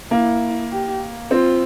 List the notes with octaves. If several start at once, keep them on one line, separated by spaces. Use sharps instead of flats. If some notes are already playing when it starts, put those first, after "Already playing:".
A#3 E4
G4
C4 F4